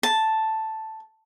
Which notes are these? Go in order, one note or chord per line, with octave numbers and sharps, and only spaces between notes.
A5